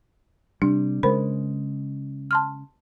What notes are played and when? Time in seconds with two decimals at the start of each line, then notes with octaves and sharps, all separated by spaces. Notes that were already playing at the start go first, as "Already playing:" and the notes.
0.62 C3 G3 D4
1.03 C#3 G#3 A#4 C5 B5
2.31 A5 C6 F6